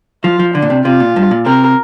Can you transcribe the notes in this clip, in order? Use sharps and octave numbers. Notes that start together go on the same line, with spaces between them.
F3 F4
F3
D3 D4
A#2
C3
C3 F4
A#2
G2
A#2
C3 A#4